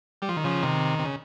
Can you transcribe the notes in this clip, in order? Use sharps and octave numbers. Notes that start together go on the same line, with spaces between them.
G3
F3
D#3
C#3 F3
C3 D#3
C3
C#3